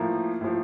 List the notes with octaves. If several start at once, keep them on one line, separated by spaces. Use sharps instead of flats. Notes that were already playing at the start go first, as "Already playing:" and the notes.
Already playing: A2 F3 A#3
A2 F3